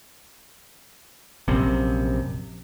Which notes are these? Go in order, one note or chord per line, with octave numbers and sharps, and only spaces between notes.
A#1 F#2 C3